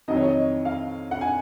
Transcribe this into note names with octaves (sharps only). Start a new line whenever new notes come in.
F2 D#3 F#3 D#5
C#5
D#5
F5
F#5
G#5